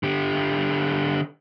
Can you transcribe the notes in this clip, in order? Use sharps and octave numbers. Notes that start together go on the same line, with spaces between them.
D3 G4